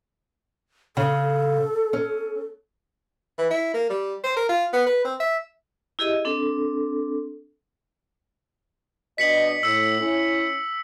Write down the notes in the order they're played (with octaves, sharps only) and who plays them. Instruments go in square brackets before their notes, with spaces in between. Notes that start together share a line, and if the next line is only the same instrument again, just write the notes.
[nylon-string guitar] C#3 [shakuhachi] A4
[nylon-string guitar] C#4
[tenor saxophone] E3
E4
A#3
G3
C5
A#4
F4
B3
B4
C4
E5
[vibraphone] E4 G4 G#4 D#5 E5
C4 D4 A4
[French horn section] B2 D4 D#5 [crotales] B6 C#7 F#7
[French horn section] A2 [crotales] E6 C#7
[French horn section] C#4 E4